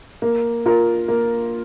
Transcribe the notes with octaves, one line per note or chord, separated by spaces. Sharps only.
A#3
F4 A#4
A#3